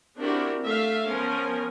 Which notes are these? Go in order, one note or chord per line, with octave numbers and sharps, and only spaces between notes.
C4 D4 E4 F#4 G4 A#4
A3 E5 F5
F3 B3 C#4 A#4